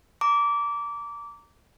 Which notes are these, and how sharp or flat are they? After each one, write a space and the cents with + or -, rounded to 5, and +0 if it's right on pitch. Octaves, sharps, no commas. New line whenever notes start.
A#5 -20 D6 -20